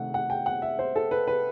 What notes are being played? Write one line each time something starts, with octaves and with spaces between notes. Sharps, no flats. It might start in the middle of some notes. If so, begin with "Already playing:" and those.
Already playing: C3 D#3 A3 F#5
F#5
G5
F#5
E5
C5
A4
B4
B4